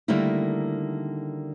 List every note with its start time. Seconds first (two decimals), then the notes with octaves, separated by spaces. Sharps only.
0.08 D3 D#3 G3 A3 A#3 E4